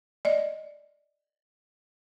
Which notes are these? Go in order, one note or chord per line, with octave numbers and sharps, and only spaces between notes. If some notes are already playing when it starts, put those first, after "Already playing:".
D5 D#5